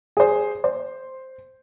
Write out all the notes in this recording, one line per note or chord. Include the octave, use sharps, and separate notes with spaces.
G#4 C5
C5